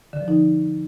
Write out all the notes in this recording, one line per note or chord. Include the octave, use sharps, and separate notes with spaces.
D3
F3
D#4